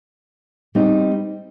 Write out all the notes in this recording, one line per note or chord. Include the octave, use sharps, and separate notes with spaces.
G3 C4 D#4